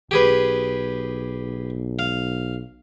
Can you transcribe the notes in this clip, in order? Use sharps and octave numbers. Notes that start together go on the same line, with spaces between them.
B1 G4 G#4 B4
F5